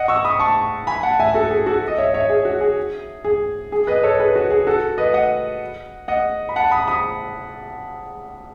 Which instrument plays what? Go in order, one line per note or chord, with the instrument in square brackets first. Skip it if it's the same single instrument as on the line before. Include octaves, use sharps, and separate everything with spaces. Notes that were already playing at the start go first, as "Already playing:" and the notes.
Already playing: [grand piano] D#5 F#5
C#6 E6
B5 D#6
A5 C#6
G#5 B5
F#5 A5
E5 G#5
F#4 A4
G#4
F#4 A4
D#5
C#5 E5
C#5 E5
G#4
F#4
G#4
G#4
G#4
B4 D#5
A4 C#5
G#4 B4
F#4
G#4
F#4 A4
B4 D#5
D#5 F#5
D#5 F#5
B5
F#5 A5
B5 D#6
B5 D#6